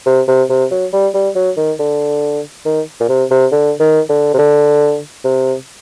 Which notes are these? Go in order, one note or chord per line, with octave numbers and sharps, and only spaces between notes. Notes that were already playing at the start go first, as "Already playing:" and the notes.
C3
C3
C3
F#3
G3
G3
F#3
D#3
D3
D#3
A#2
C3
C3
D3
D#3
D3
C3
D3
C3